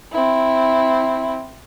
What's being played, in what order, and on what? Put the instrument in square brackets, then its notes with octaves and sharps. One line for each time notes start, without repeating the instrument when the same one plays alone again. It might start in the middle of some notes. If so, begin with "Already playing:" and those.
[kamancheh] C4 E4